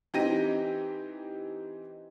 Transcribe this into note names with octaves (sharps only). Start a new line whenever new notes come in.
E3 C4 D#4 G4 A#6 D#7